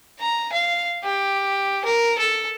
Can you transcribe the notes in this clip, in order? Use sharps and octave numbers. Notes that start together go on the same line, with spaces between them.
A#5
F5
G4
A#4
A4